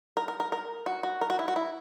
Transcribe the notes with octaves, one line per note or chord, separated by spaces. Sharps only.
A#4
A#4
A#4
A#4
F#4
F#4
A#4
F#4
E4
F#4
E4